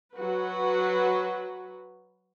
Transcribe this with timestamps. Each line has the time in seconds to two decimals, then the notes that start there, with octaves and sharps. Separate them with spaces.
0.15 F#3 F#4 B4